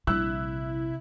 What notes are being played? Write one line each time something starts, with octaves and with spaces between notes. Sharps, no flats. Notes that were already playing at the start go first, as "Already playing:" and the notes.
A#1 C3 G3 D4 E4 E6 F#6